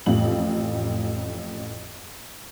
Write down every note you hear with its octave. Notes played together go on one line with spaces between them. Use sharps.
A1 F2 F5 F#7